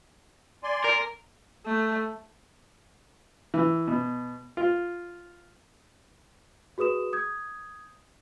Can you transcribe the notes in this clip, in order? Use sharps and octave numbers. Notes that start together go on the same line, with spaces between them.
D5 G#5 C6
A#4
A3
E3
B2
F4
F#4 G#4 B4 D#6 E7
D#6 G6 G#6